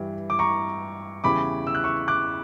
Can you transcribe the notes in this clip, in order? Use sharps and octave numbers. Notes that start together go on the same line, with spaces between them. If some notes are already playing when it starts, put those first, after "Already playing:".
Already playing: G2 E3 G3
D6
A#5 C#6
E2 C#3 E3 G3 B5 D6
E6
F#6
C#6 E6
D6 F#6